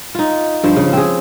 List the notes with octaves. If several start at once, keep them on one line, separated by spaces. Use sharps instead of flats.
D#4 F4
G2 F3 C5
C#3
C4 G#4